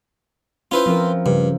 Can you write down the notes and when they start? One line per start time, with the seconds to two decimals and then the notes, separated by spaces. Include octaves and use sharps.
0.71 C#4 E4 F4 B4 C5
0.86 F3 C4 A#4
1.26 G2 C#3